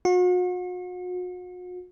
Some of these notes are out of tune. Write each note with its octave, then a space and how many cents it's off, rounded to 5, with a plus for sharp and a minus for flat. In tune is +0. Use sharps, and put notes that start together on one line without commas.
F#4 -40